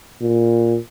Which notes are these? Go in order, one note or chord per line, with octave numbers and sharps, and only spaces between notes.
A#2